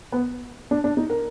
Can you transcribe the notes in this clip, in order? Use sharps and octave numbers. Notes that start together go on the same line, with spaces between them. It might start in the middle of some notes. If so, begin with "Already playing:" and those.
B3
D4
D4
D#4
A#4